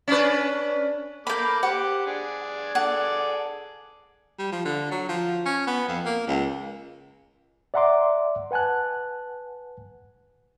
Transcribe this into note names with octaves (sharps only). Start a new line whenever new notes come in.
C#4 D4 B4
A#3 A4 B5 D6 G6
G4 C5 F#5 D6
D4 G#4
G#4 A4 D5 F#5
G3
F3
D3
F#3
F3
C#4
B3
F2
A#3
C#2
D5 E5 F#5 A#5 C6 D6
B4 F#5 G#5 A5 F#6